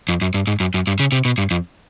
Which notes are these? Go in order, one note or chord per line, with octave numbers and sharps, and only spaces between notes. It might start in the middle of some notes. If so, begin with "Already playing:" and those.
F2
F#2
G2
G#2
F#2
F#2
G2
C#3
C3
B2
G2
F2